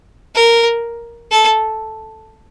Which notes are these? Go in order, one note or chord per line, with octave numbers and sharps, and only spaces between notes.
A#4
A4